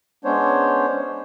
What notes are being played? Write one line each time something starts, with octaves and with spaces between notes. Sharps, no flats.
G#3 B3 C#4 D4 C5 C#5